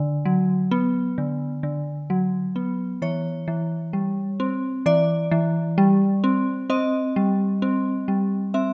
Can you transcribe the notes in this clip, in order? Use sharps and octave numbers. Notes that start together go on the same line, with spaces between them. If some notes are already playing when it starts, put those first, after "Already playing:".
Already playing: D3
F#3
B3
D3
D3
F#3
B3
E3 C#5
E3
G3
C4
E3 D5
E3
G3
C4
C4 D#5
G3
C4
G3
C4 E5